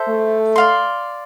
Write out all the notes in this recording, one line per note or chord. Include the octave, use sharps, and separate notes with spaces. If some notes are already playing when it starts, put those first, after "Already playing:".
Already playing: A4 C5 E5
A3
D5 F5 C6